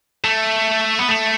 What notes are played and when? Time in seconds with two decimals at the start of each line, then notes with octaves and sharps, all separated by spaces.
0.24 A3
0.99 B3
1.08 A3